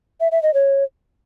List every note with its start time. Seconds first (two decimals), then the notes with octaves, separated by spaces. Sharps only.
0.20 E5
0.32 E5
0.43 D#5
0.54 C#5